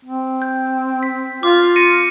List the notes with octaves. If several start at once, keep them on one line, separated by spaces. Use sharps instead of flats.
C4
G6
B6
F4 D6
A#6 C#7 D#7